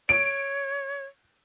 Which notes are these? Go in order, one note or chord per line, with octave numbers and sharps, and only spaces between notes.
C#5 D7